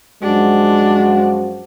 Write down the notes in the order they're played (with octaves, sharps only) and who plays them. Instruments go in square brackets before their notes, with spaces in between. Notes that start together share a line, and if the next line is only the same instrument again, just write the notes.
[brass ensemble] F#2 F3 F#4 [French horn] G#3 [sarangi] D4